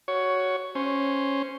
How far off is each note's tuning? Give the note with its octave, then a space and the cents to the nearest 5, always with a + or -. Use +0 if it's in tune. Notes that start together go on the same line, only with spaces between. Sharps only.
F#4 +0 C#5 +10
C#4 -5 C5 +0